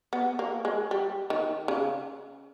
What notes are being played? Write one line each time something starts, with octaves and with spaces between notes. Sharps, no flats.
B3
A#3
G#3
G3
D#3
C#3